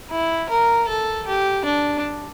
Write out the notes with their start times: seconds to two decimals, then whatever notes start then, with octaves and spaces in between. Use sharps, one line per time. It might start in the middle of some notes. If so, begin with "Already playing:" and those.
0.11 E4
0.50 A#4
0.89 A4
1.27 G4
1.65 D4